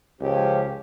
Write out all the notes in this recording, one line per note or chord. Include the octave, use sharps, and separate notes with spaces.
C#2 F3 C#4 G4